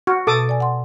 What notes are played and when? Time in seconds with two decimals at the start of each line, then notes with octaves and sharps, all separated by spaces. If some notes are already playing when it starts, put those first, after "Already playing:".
0.07 F#4 C#6 F6
0.27 B2 A4 D6 D#6
0.49 D5 G#5
0.60 F#5 C6